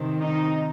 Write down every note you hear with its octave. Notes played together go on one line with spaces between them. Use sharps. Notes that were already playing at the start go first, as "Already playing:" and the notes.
Already playing: C3 D#3
D#4